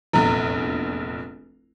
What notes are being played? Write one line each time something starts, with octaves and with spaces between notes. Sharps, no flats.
F1 A#1 E2 E4